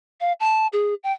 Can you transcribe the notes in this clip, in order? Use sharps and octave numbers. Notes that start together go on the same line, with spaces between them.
F5
A5
G#4
G5